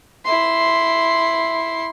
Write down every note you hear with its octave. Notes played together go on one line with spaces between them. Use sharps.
E4 C6